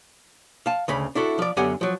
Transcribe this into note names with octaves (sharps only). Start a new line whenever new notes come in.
F5 A5
D2 C#3 B5
D4 E4 F#4 A4
F3 D5
F#2 D3 B3 G4 F#5 G#5
F3 F#3